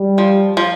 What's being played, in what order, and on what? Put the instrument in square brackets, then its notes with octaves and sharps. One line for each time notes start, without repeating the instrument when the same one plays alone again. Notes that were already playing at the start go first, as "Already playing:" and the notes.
Already playing: [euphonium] G3
[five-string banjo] F3
F3